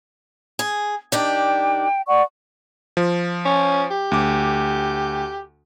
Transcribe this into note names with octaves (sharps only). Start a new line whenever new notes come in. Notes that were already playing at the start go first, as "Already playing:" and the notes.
G#4
D#3 D4 G4 G5
D5 F#5 C#6
F3
C#4
G4
D2 D6